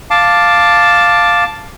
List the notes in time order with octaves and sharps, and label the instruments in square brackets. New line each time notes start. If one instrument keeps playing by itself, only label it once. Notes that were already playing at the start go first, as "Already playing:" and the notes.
[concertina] F5 A5 D6